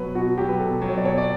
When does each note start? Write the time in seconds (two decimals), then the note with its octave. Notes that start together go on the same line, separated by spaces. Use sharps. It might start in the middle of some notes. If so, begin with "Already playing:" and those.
Already playing: B2 F#3 B4 C#5
0.15 B2 F#4
0.38 F#3 G4
0.49 B4
0.59 B2 A4
0.82 F#3
0.89 C#5
0.97 D5
1.03 B2 C#5
1.18 D5